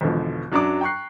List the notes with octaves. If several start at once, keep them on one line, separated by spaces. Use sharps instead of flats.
G#1 E2 B2 D3 F3
F#2 F#3 D4 A#5 D6
G5 A#5 C#6 F#6 C7